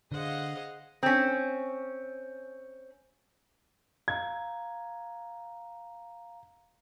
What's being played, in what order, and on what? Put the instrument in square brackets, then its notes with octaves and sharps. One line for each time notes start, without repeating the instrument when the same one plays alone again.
[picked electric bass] D3 [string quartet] G#4 D#5 F5 [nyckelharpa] C5 F#5
[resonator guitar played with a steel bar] C4 C#4
[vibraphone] F5 A#5 [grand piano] G#6